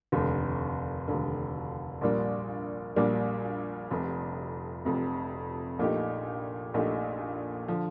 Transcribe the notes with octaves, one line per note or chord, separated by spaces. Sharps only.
F1 D#2 D3
F1 D#2 D3
A#1 A#2 G3 A#3 D4
A#1 A#2 G3 A#3 D4
F1 F2 C3
F1 F2 C3
A#1 A#2 A3 D#4 G4
A#1 A#2 A3 D#4 G4
D3 F3